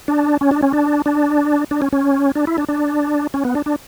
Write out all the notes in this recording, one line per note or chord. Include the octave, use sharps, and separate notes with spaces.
D4
C#4
D4
C#4
D4
D4
D4
C#4
C#4
D4
E4
D4
D4
C#4
B3
D4
D4